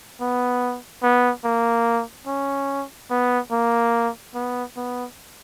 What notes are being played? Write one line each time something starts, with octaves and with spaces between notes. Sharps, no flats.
B3
B3
A#3
C#4
B3
A#3
B3
B3